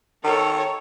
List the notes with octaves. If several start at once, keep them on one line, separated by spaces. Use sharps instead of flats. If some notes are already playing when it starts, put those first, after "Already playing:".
D#3 A4 C#5